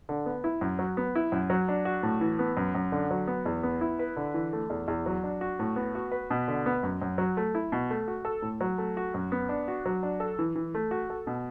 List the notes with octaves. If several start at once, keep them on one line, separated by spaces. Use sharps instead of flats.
D3
B3
E4
F#2
F#3
B3
E4
F#2
F#3
D4
F#4
A2
E3
B3
F#2
F#2
D3
F#3
B3
E2
B3
E4
B4
D3
E3
A3
E2
E2
F#3
D4
F#4
A2
B3
F#4
B4
B2
D3
B3
F#2
F#2
F#3
A3
E4
B2
A3
F#4
A4
A2
F#3
A3
F#4
F#2
B3
D4
F#4
F#3
D4
A4
E3
E3
A3
F#4
A4
B2